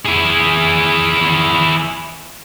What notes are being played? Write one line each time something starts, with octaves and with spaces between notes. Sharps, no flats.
E4 G#4